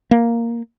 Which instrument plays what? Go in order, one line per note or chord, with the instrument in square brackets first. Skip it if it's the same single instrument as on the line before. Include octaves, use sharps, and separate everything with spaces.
[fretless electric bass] A#3